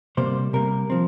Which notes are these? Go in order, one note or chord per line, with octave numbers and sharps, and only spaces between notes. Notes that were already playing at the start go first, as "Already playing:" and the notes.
C3 G3 A#3 C5
C3 G3 A#3 A#4
F3 C4